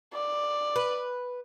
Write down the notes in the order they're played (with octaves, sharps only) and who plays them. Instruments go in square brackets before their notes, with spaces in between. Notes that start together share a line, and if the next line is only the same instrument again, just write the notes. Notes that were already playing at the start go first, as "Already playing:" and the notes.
[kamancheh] D5
[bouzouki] B4